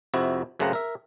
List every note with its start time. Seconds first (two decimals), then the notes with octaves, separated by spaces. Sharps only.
0.14 F2 C3 E4 F#4
0.59 F#2 C#3 A3 C4 F#5 A#5
0.73 A#4 E5